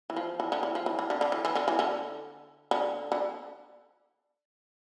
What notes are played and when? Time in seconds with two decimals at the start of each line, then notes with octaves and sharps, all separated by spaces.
0.10 E3
0.16 F3
0.40 E3
0.52 D3
0.63 E3
0.75 F3
0.86 E3
0.99 E3
1.10 D3
1.21 D3
1.32 E3
1.45 E3
1.55 D3
1.68 E3
1.79 D3
2.71 D3
3.12 D3